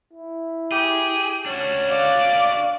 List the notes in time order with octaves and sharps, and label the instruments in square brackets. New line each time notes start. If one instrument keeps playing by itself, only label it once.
[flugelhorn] E4
[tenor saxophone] G4 [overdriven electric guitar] G#4
[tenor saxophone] C#4 [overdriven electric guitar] D4 F#4
[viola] D5 [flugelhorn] F5